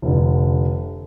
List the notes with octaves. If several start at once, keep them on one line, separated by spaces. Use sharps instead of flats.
F1 D3